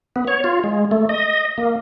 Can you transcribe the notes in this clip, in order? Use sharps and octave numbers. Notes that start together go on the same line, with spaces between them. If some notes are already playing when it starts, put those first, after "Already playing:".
B3
C#5
F4
G#3
A3
D#5
A#3